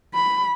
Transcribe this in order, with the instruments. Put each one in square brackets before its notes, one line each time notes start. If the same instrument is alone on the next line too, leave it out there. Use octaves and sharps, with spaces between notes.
[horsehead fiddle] B5